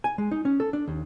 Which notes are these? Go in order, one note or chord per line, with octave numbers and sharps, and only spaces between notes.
G#5
G#3
D#4
C#4
A4
D4
D#2